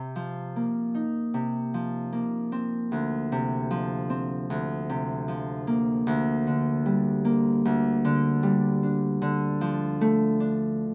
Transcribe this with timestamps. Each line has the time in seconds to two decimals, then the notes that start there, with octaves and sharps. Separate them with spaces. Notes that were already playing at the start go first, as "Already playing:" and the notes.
Already playing: C3
0.16 F3
0.56 A#3
0.94 D#4
1.34 C3
1.74 F3
2.13 A#3
2.52 C4
2.92 D2
3.32 C3
3.71 F3
4.10 C4
4.50 D2
4.90 C3
5.28 F3
5.67 A#3
6.07 D2
6.47 D3
6.86 G3
7.25 A#3
7.65 D2
8.05 D3
8.43 G3
8.83 D4
9.22 D3
9.61 F3
10.01 A3
10.40 D4